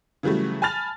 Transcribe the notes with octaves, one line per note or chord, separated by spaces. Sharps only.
C#3 E3 F#3 G3 A3
G#5 A5 B5 F6 A6 F7